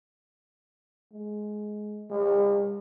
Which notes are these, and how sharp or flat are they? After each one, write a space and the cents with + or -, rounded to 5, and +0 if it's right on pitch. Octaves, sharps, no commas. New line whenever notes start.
G#3 +15
G3 +45